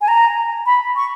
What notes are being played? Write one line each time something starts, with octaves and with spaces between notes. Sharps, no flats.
G#5
A#5
B5
C#6